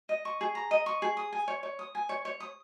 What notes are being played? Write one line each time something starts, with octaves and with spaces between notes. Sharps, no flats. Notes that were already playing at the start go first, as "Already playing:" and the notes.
D#5
C#6
G#4
A#5
D#5
C#6
G#4
D#6
G#5
C#5
C#5
D#6
G#5
C#5
C#5
D#6